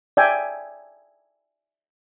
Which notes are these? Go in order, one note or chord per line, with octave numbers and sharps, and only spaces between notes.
D5 E5 G5 G#5